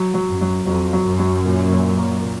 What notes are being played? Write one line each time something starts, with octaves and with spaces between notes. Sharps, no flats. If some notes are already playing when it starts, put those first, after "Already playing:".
Already playing: F#3
F#3
F#2
F#3
F2 F#3
F#3
F#2
F#3
A#2
A#2
A#3
A#2